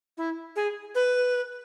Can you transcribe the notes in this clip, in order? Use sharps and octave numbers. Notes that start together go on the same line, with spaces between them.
E4
G#4
B4